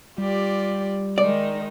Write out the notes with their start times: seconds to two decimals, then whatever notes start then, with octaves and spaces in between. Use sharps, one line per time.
0.18 G3 F4 G4 D5
1.18 D#3 G#3 D#4 D5